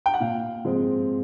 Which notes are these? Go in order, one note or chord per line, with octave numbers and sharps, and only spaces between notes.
G5
F#5
A#2 F5
F3 G#3 C4